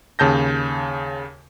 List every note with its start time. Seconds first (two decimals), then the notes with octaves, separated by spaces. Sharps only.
0.19 D#2 C#3 A5 G6 A#6